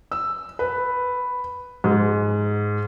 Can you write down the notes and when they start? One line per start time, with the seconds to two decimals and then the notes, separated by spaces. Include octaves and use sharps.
0.12 E6
0.59 B4
1.84 G#2